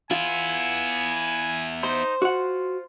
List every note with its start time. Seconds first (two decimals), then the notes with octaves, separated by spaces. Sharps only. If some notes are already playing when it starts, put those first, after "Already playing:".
0.11 B3 E4 F4 G#5
1.83 D#4 C5
2.22 F4 F#4 F#5